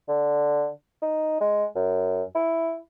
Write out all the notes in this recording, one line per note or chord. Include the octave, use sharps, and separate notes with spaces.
D3
D#4
G#3
F#2
E4